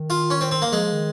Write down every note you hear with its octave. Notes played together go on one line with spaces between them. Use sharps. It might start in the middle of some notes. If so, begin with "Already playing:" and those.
Already playing: D#3
F4
C#4
C4
C4
A#3
F3 G#3
D#3